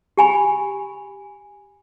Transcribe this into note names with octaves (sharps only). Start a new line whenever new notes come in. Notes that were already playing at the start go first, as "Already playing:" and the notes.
G4 G#5 B5